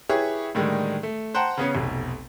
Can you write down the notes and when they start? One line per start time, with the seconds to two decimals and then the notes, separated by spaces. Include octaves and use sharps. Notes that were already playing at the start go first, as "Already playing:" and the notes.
0.09 E4 G4 G#4 B4 C#5 E5
0.55 A2 D3 D#3 G3 G#3
1.03 A3
1.34 C5 F#5 G5 A5 A#5
1.57 C#3 B3 C#4
1.75 F1 B1